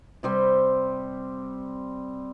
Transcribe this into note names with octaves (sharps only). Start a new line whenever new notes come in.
C3 G3 C4